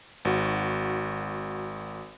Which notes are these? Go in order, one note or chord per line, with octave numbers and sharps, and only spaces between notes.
G#1 F#4